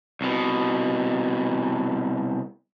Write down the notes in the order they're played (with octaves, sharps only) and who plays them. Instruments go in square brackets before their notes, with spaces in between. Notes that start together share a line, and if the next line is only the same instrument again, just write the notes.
[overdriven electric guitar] C2 B2